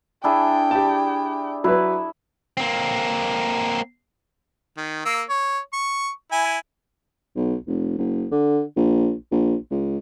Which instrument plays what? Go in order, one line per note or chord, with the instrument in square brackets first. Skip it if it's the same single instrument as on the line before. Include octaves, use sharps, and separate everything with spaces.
[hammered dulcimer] D4 E4 G#4 [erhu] G5
[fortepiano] G4 A5
[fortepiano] F#3 B4 [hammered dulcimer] E4
[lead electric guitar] A#3 C4
[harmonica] D#3
A#3 E6
C#5
C#6
E4 G#5
[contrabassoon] B1
F1
F#1
D3
A#1
A#1
C#2